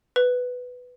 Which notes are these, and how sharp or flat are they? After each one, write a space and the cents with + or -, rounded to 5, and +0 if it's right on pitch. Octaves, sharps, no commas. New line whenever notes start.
B4 +5